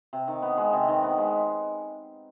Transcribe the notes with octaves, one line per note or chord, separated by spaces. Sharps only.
C3
D#3
B3
G#3
C3
D#3
B3
G#3